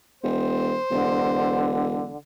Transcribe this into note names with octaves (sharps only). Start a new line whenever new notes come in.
E1 C5
E1 D3